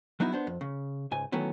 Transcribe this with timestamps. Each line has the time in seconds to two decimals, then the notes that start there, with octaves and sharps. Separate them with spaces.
0.20 F#3 B3 D#4 E4 F#4
0.32 B3 D4 C5
0.47 F2
0.61 C#3
1.11 C#2 G#2 G#5
1.32 D#3 E3 F#3 A3 B3 C#4